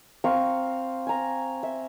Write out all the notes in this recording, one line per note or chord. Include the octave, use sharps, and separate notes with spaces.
C4 F5 A#5 C#6
G#5 A#5
E5